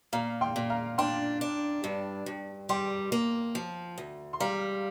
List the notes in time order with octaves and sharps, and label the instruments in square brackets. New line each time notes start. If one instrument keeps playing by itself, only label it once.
[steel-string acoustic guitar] A#2 [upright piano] F5 A#5
[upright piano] G5 C6
[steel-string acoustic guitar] A#2
[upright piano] F5 A#5
[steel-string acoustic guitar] D4 [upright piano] G5 C6
[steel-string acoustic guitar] D4
G2
G2
[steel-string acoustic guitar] G3 [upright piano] G5 C6
[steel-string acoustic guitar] A#3
F3
D2
[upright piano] C6
[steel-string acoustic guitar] G3 [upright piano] F5 A#5